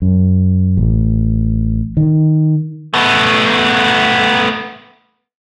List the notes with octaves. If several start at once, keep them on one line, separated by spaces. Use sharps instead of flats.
F#2
A1
D#3
A3 B3